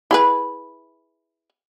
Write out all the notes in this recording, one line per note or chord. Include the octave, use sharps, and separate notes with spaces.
E4 G#4 B4